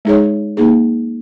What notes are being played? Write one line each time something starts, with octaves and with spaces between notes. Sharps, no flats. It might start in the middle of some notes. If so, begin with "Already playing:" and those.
G#3 D#4 G#4 C#5
A#3 D#4 G#4